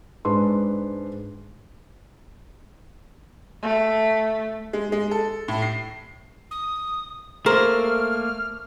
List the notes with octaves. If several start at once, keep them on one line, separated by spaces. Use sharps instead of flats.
G#2 D4 B4 C6
A3
G#3
G#3
A4
A2
C7
D#6
A3 A#3 A#4 C5 F6